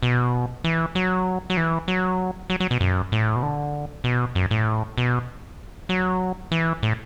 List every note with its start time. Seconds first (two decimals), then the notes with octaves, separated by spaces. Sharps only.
0.03 B2
0.64 E3
0.95 F#3
1.50 F#3
1.57 E3
1.88 F#3
2.50 F#3
2.60 F#3
2.71 B2
2.81 F#2
3.12 A2
3.36 B2
3.42 D3
4.04 B2
4.35 F#2
4.51 A2
4.98 B2
5.89 F#3
6.52 E3
6.83 A2